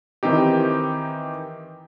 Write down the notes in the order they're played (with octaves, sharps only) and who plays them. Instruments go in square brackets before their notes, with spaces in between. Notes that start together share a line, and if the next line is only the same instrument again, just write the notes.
[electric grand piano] D#3 E3 C4 D#4 G4